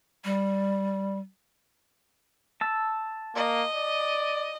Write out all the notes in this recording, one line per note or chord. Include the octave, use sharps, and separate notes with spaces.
G3
A5 E6
A#3 D#5
D5